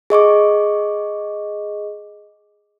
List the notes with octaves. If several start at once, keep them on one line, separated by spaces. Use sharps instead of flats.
G#4 D#5 C#6 D6